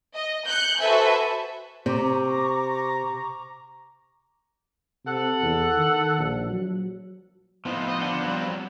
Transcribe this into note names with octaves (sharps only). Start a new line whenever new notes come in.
D#5
F#6 G6 C#7
F#4 A4 B4 C5 E5 G#5
C3 A#5 C#6 D6
C3 A4 F#5
E2
D#3
A#1
F#3
A2 F3 B3 C4 D#4
D#5
D4 F#5
F#3 G3